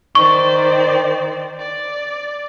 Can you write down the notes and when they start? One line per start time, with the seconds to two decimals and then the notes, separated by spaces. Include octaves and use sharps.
0.15 D#3 C5 D5 C#6
1.60 D5